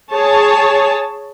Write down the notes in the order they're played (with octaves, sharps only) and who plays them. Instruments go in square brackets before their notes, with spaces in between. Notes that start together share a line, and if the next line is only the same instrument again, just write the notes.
[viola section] G#4 C#5 A5